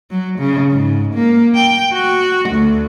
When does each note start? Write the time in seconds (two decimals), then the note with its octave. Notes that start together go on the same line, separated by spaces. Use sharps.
0.11 F#3
0.39 C#3
0.71 G#2
1.15 A#3
1.55 G5
1.94 F#4
2.50 D2